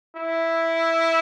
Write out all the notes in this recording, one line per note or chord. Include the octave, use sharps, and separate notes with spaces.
E4